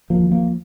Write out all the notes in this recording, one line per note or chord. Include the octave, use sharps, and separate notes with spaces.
F3 A#3
D#2
F3 A#3